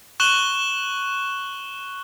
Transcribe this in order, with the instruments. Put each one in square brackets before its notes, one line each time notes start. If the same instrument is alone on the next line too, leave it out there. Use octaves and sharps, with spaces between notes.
[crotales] C#6 F#6 E7 F#7 G7